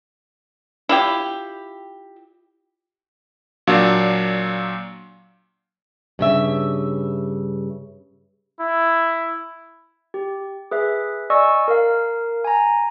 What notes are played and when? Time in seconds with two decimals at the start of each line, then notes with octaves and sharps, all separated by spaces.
0.89 E4 F4 G4
3.67 A#2 F#3 D4 F5
6.19 G2 C#3 E5
8.60 E4
10.14 G4
10.71 G#4 B4 E5
11.30 D5 D#5 G#5 C#6 E6
11.68 A#4 F5
12.44 G#5 A#5